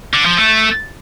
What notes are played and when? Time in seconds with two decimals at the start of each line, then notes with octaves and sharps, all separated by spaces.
0.14 D3
0.26 F3
0.37 A3